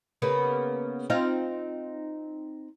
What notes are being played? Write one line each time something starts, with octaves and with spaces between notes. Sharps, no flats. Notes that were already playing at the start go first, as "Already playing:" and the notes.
C#3 A#3 B3
C4 D#4 F4